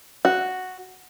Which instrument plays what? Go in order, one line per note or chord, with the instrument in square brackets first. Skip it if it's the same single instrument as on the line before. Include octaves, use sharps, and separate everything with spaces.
[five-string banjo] F#4